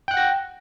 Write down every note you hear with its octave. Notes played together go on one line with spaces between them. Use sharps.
F#5 G5 F#6 A#6